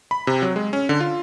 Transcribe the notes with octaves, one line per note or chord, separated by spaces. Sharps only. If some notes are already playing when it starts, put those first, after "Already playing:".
B5
C3
F#3
G#3
C#4
D3
F4